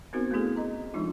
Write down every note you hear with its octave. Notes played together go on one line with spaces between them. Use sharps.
B3 C4 D#4 F#4 A#4 C5
A3 B3 C#4 E4 G#4 A4
D#5 A#5
F3 G#3 D4 D#4 F4